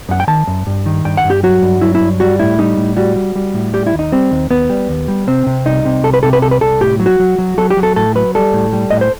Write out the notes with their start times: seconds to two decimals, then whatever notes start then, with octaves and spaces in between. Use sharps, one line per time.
0.09 F#2 F#5
0.20 G5
0.28 D#3 A5
0.47 F#2
0.67 G2
0.86 D#3
1.05 G2 G5
1.17 F#5
1.24 G2
1.30 G4
1.43 F#3 F#4
1.62 G2
1.81 F#3 E4
1.95 E4
2.01 G2
2.20 G3 F#4
2.39 A2 E4
2.59 G3 D#4
2.78 A2
2.97 G3 F#4
3.16 G3
3.36 G3
3.55 A2
3.73 G3 G4
3.86 E4
3.93 D#2
3.99 D#4
4.12 G3 C4
4.31 D#2
4.50 D#2 B3
4.69 G3
4.89 D#2
5.08 G3
5.27 C3 C4
5.46 C3
5.66 C2 D#4
5.85 C3
6.04 C2 A4
6.14 B4
6.23 C3 A4
6.33 B4
6.42 C2 A4
6.51 B4
6.61 C2 A4
6.81 A2 G4
6.99 F#3
7.06 F#4
7.19 F#3
7.38 F#3
7.58 F#3 A4
7.70 G4
7.77 F#3
7.83 A4
7.96 A2 A4
8.16 F#3 B4
8.35 G3 A4
8.53 A2
8.73 G3
8.90 A2 D#5
9.01 C5